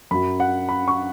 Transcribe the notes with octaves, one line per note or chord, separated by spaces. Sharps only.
F#2 F#3 B5
F#5
B5
C#6